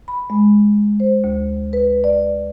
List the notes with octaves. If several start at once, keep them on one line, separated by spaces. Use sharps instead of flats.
B5
G#3
C5
D2
B4
D5